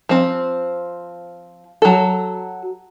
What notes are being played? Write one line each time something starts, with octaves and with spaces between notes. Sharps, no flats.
F3 C4
F#3 A4